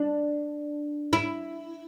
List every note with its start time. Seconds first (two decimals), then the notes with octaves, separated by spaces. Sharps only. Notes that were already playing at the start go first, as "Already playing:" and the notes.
Already playing: D4
1.13 E4